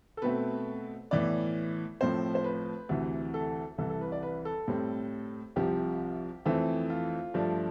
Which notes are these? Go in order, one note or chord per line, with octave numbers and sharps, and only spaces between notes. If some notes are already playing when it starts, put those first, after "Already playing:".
A4
B2 A3 C4 B4
A2 E3 B3 D5
A2 F3 C4 C5
C5
B4
D2 C3 E3
A4
C2 C3 E3 A4
A4
B4
D5
B4
A4
A2 G3 C4
C2 C3 F3 G4
F2 E3 A3 C4
F4
G2 F3 A3 D4